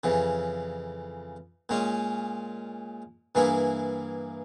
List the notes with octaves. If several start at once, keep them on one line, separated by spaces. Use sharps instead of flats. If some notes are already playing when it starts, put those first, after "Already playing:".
F2 C#3 E3
A#2 G#3 C#4
G2 E3 A#3 E4 G#4